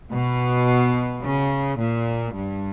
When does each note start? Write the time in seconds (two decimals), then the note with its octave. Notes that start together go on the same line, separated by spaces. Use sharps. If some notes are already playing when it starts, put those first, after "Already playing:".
0.12 B2
1.23 C#3
1.78 A#2
2.34 G2